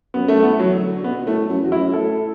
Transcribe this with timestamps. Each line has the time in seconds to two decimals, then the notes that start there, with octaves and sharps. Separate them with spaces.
0.14 F#2 B3
0.28 A3
0.43 A2 B3
0.59 E3 F#3
0.74 D3
1.04 B2 B3
1.26 A2 A3
1.49 F#2
1.61 E2 F#4
1.72 F#2 E4
1.94 A2 A4